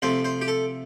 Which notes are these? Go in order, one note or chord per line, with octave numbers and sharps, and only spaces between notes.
C3 F3 A3 C5
C5
G4
A4